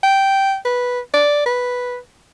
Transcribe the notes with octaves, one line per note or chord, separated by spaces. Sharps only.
G5
B4
D5
B4